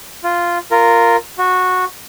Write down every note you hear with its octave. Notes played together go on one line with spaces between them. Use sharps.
F4
F4 A#4
F#4